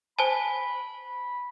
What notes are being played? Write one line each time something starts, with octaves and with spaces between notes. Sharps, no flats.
C5 G#5 A5 B5